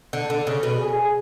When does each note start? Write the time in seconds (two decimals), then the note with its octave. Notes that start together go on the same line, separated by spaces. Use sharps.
0.13 D3
0.30 D3
0.47 C#3
0.63 B2
0.79 G#4